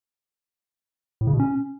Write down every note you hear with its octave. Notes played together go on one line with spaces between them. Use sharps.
A2
C#3
B2
C#4